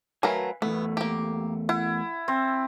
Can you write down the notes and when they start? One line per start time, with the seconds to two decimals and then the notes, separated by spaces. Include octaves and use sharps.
0.23 F#3 A3 A#4 B4 F5 G#5
0.62 E2 A3 B3
0.97 A#3 G4
1.69 E4 F#5
2.28 C4